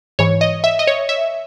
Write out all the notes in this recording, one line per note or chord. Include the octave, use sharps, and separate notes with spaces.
G#2 E3 C#5
D#5
E5
D#5
C#5
E5